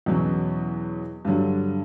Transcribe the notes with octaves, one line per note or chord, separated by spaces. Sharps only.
E2 B2 F#3 C#4
G2 D3 F#3